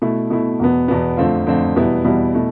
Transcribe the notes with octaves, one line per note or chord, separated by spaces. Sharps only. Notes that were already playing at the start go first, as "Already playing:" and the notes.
B2 A3 E4
B2 A3 E4
E2 B2 B3
E2 B2 B3
F2 D3 A3 C4 F4
F2 D3 A3 C4 F4
E2 B2 G3 B3 E4
E2 B2 G3 B3 E4
B2 A3 E4